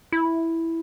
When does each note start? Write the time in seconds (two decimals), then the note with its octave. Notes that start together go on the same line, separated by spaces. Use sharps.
0.12 E4